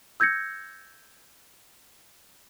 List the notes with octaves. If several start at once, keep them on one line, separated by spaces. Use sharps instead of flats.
E6 G6 G#6 A#6 C#7